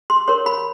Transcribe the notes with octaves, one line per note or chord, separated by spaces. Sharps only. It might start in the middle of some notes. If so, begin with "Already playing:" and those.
C6
A#4 C#5 C6
B5